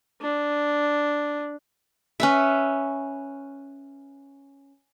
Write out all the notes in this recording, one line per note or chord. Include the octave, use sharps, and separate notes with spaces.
D4
C#4 B4 E5